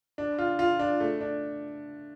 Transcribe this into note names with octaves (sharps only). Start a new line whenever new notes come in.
D4
F4
F4
D4
A3
D4